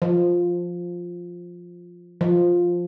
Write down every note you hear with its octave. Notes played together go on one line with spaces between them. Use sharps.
F3
F3